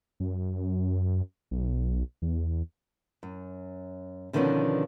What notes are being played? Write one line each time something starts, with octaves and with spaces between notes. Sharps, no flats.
F#2
B1
E2
F#2
B2 D3 D#3 F3 B3 C#4